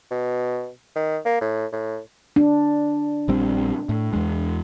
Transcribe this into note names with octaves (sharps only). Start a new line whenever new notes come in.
B2
D#3
A#3
A2
A2
D4
A#1 G3 C4
A2
E2 G#3